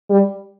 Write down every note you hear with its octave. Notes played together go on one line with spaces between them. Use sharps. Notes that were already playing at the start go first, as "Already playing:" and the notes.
G3